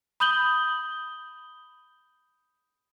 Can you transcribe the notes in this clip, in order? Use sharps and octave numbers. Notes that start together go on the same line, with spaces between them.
B5 D#6 G6 F#7 G7